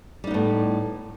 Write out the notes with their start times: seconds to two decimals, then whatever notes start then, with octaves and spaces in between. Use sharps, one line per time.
0.24 G3
0.27 D#4
0.31 B3
0.34 A2